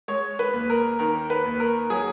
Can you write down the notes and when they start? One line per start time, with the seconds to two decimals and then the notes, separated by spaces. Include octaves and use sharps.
0.08 G#3 C#5
0.39 B4
0.54 D#2
0.70 A#4
0.99 D#3 A#4
1.30 B4
1.46 D#2
1.60 A#4
1.90 F#3 G#4